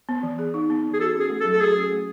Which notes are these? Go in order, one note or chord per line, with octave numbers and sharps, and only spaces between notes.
B3
E3
G#4
D#4
B3
E3
G#4
F#4 A4
C#4
G#4
A3
A4
F#3
A4
F#4 G#4
C#4
A3